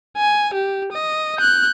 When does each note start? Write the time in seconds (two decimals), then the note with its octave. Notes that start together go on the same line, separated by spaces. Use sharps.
0.17 G#5
0.54 G4
0.93 D#5
1.38 F#6 G6